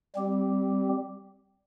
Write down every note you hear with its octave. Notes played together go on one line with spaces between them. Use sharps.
G3 C4 G4